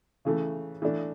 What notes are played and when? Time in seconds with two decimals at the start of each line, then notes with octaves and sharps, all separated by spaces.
0.25 C#3 E3 A3
0.82 E3 A3 D4